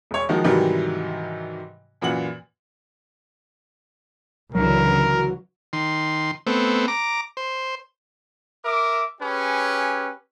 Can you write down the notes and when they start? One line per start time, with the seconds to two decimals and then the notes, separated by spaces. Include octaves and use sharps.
0.11 E1 C#5
0.29 D#3 F3 G#3 F#4
0.44 G#2 C3 D#3 E3 F#3 G3
2.02 F#2 A#2 E3 F#5 F#7
4.55 C#2 D3 E3 F#3 A#4
5.73 D#3 C6
6.47 A3 B3 C4
6.88 A#5 D6
7.37 C5
8.65 A#4 E5 D6
9.21 C#4 G4 G#4 B4